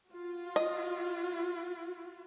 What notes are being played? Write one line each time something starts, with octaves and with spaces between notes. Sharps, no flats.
F4 F#4
D#5